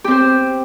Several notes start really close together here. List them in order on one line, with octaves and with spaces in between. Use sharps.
G4 C4 C5